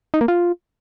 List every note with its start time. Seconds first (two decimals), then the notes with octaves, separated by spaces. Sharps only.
0.14 D#4
0.21 A#3
0.28 F4